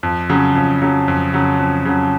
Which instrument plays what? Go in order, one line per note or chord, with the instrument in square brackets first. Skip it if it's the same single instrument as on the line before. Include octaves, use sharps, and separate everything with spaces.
[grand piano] F2
C#3 F#3
F2
C#3 F#3
F2
C#3 F#3
F2
C#3 F#3